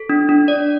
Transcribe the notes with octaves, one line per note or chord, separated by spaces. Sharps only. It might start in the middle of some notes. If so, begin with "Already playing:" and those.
Already playing: A4
D4
D4
D5